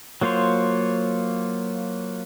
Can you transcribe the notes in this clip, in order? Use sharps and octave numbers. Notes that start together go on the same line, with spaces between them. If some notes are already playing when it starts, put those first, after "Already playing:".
F#3 A#3 F4 C5 C#5